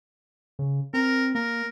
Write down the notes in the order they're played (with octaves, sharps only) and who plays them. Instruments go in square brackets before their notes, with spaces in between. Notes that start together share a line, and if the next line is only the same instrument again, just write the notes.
[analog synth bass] C#3
[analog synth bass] C4 [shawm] A#4
[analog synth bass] A#3 [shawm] A#4